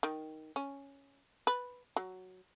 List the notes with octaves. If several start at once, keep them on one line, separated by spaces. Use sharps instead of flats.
D#3
C#4
B4
F#3